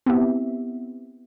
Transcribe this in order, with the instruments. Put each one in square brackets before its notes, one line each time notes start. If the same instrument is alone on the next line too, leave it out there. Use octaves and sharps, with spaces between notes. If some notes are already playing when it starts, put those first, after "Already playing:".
[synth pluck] B3 C4 E4 G4 E5